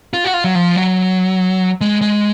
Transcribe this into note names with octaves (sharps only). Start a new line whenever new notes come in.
F4
F#4
F4
F#3
F3
F#3
G#3
G#3